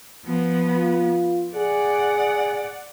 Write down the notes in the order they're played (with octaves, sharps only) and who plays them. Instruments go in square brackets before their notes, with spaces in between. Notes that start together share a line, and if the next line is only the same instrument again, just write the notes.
[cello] F3 B3
[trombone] F4
[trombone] G#4 [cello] D5 F#5